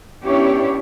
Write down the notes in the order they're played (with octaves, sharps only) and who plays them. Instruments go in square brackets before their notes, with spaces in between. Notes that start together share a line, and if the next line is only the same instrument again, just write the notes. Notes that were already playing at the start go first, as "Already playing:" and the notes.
[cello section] B3 C#4 D4 E4 G4 C#5